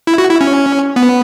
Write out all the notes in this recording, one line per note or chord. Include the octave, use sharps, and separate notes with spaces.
E4
F#4
E4
C#4
B3